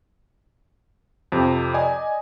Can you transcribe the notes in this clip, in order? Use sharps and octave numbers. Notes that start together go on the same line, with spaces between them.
F2 C3
D5 D#5 G#5